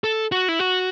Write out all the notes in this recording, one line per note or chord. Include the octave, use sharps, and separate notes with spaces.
A4
F#4
E4
F#4